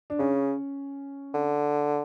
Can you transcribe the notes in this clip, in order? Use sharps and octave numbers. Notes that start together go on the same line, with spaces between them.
D4
C#3 C#4
D3